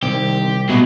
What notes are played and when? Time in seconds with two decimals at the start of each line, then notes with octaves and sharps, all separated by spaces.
0.03 C2 D#3 C4 G4
0.69 B2 G3 G#3 F#4 D#5 E5